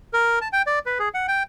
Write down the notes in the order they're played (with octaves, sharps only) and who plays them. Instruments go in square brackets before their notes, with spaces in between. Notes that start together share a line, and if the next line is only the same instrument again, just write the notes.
[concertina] A#4
A5
G5
D5
B4
G#4
F#5
G5